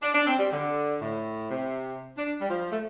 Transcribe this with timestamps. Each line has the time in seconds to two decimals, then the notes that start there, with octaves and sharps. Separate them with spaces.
0.03 D4
0.15 D4
0.27 C4
0.39 G3
0.52 D3
1.02 A2
1.51 C3
2.17 D4
2.41 G3
2.50 F3
2.71 A3